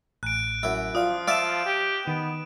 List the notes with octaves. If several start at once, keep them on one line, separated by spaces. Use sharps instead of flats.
A1 F#6 D7
F#2 E4
F3 F4 D5 F5 D#6
D5 E5 F5 A5 D7 E7
G4
D#3 B3